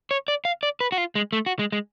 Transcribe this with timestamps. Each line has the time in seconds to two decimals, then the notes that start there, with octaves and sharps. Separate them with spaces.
0.11 C#5
0.28 D5
0.45 F5
0.63 D5
0.80 B4
0.92 F#4
0.98 F4
1.15 G#3
1.33 A3
1.46 F#4
1.59 G#3
1.72 G#3